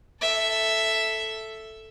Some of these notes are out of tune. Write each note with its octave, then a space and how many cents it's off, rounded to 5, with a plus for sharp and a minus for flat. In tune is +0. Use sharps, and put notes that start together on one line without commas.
A4 +0 E5 +0